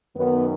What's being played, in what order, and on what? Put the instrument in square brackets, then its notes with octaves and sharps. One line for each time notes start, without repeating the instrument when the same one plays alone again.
[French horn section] F#2 D#3 B3